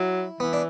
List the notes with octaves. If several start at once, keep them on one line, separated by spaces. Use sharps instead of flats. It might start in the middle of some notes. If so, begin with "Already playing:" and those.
Already playing: F#3 E4
E3 B3
D4